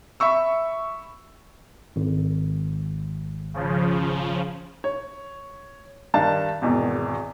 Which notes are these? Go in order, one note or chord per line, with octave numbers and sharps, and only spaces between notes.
E5 B5 C#6 E6
G#1
C#3 F3
C#5
G2 D#3 D4 F5 A5 A6
G#1 E2 B2 D#3